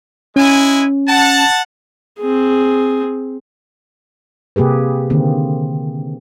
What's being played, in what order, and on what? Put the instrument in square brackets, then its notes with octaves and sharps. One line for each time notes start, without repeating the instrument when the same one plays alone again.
[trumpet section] G#3 E4 G#5 [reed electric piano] C#4
[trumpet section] F#5 A5
[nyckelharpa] C4 G#4
[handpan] C3 A#3 G4 G#4 B4
D3 D#3 A#3 C4